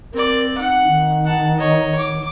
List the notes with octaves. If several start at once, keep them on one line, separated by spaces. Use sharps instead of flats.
C4 A#4 D5
D#4 F#5
D#3
F#5 A5
C#5 D#5
D6